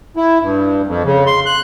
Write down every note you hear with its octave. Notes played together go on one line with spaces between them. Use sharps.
E4
G2
F2
C#3
C6
F#6